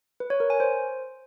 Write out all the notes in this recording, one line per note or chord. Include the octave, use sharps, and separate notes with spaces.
B4
C#5
A#4
G#5
C5